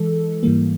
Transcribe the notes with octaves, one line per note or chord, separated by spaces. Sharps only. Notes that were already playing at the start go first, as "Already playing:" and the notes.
Already playing: E3 G#3 A4
G#2 E3 G3 A#3